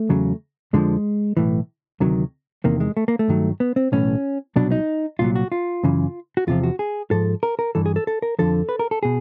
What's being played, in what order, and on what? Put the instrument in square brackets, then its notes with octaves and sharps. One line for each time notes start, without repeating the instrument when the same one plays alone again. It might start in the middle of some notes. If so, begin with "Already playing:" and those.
Already playing: [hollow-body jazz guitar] A3
E2 C#3 F#3
F2 D3 F3 G#3
B1 A2 E3
D2 C3 D#3 F#3
E2 C3 D#3 A#3
G#3
A3
A#3
A3
G2 D#3 F#3
B3
C4
B1 A2 E3 C#4
C2 B2 F#3 D4
D#4
C2 A#2 F#3 F4
F#4
F4
F#2 C#3 E3
F#4
E2 C3 F3 F4
F#4
G#4
G#2 F3 A4
A#4
A#4
G2 E3 A4
G#4
A4
A4
A#4
F2 D3 F3 A4
B4
A#4
A4
B2 G#4